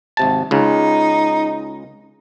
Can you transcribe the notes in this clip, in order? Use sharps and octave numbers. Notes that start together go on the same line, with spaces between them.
G#1 C3 A5
C#2 C#3 D#4